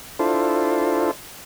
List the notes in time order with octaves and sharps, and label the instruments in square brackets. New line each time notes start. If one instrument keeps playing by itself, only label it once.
[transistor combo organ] D4 E4 F4 A4 C5